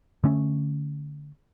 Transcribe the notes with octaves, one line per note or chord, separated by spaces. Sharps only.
D3 A3 C#4